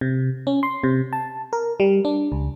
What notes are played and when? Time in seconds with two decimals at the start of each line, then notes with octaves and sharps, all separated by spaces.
0.01 C3
0.47 C#4
0.63 C6
0.83 C3
1.13 A5
1.53 A#4
1.80 G3
2.05 D4
2.32 C#2